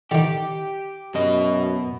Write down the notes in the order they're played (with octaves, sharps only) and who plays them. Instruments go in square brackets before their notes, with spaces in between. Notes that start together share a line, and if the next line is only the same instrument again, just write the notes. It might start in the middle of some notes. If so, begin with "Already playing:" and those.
[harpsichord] D3 D#3 [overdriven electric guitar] G4
[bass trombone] F#2 [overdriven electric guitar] B2 D#5